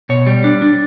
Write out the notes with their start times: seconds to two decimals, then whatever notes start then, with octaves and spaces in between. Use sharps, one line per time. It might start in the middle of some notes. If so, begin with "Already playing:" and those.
0.09 B2 C#5
0.27 G3
0.44 D4
0.62 D4